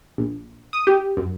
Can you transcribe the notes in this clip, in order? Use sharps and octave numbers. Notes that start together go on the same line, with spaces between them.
A#1
D#6
G4
F#2